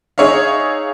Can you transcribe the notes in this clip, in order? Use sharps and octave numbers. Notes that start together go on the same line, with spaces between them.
D#4 G#4 C#5 E5 F5